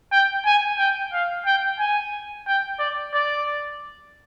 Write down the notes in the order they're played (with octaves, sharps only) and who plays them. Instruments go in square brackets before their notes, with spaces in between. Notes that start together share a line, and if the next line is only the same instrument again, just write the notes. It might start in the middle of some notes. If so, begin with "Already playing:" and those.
[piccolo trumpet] G5
G#5
G5
F5
G5
G#5
G5
D5
D5